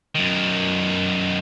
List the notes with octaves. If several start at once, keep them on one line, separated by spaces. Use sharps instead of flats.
F#2 D#3